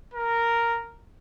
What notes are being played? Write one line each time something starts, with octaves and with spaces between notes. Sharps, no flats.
A#4